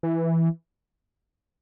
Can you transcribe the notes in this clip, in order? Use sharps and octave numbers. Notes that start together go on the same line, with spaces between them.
E3